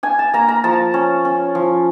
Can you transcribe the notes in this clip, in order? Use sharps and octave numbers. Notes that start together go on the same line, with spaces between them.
D4 G#5
A5
A#3 A#5
A#5
F3 A5
C#4
C#4
F3